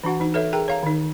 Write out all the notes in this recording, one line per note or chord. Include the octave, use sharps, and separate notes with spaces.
E3 D4 F#4 F#5
E3 D#4
A4 B4 C#5 E5
G#4 A#4 G5 A#5
C#5 F5 A#5
D#3 D#4